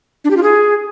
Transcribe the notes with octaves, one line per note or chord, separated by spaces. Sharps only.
D4
G4
F4
G#4